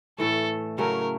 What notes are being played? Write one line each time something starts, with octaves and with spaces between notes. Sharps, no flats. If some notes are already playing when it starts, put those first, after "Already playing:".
A2 E3 A3 A4
C#3 F#3 A3 C#4 A#4